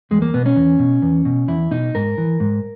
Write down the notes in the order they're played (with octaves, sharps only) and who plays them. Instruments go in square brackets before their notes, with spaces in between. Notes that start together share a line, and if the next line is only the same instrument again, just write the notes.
[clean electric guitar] E2 G#3
A#3
B2 B3
C#4
E2
B2
E2
B2
E2 E4
B2 D#4
G#2 A#4
E3
G#2